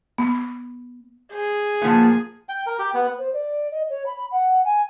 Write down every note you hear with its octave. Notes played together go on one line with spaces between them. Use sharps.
B3
G#4 C5
A#2 F3 A#3 B3 A5
G5
A#4
G4
B3
C5
D5
D#5
C#5
B5
F#5
G#5